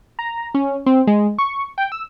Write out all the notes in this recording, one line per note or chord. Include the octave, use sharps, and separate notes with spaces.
A#5
C#4
C4
G#3
C#6
G5
E6